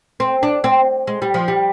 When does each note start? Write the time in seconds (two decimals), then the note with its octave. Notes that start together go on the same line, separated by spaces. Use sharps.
0.20 C4
0.43 D4
0.64 C4
1.07 G#3
1.22 G3
1.34 F3
1.48 G3